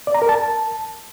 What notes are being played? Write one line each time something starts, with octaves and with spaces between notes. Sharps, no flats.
D5
A#5
A#4
A5